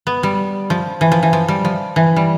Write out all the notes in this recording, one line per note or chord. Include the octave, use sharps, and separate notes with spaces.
B3
G3
F3
E3
F3
E3
F3
G3
F3
E3
G3